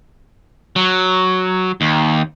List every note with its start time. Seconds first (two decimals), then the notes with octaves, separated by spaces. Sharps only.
0.76 F#3
1.81 D#2